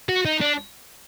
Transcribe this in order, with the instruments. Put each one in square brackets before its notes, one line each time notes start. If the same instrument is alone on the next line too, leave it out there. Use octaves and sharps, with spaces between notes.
[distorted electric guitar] F#4
D#4
D4